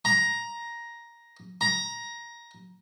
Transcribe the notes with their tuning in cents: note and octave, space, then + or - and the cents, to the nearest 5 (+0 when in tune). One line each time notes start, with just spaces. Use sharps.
A#5 +10
A#5 +15